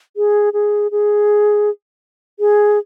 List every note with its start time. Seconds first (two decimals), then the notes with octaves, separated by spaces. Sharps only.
0.17 G#4
0.53 G#4
0.91 G#4
2.40 G#4